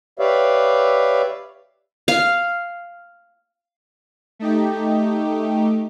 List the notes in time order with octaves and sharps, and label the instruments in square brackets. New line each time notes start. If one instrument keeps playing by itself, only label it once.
[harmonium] G4 B4 C#5 D5 E5 F5
[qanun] F5
[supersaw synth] A3 D#4 G4